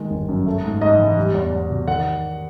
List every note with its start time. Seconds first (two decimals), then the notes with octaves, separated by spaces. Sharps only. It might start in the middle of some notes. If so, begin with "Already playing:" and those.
Already playing: D#3 G#3
0.11 G1
0.29 F#2
0.46 A3
0.64 G#2
0.81 G#2 D#5
0.99 E3
1.17 G3
1.34 E2
1.52 E2
1.70 B2
1.87 D#3 F#5